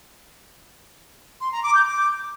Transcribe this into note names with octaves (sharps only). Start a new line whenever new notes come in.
C6
A#5
D6
G6
D6